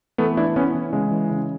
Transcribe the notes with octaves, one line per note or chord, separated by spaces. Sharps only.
E3 A3 B3
E3 D4 E4
E3 B3 C#4
E3
C#3 G#3
E3
C#3